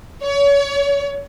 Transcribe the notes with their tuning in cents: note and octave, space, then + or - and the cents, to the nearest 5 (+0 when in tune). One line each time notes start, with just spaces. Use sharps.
C#5 +30